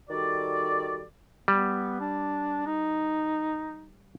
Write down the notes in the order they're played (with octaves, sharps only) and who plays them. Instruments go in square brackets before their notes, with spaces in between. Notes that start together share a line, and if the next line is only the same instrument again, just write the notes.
[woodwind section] D#3 G3 F#4 A4 D5
[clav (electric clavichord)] G3 [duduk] B3
[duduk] D4
D#4